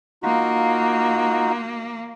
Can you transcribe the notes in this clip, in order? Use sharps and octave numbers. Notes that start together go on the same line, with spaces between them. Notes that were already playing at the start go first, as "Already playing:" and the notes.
A#3 D#4 F4 F#4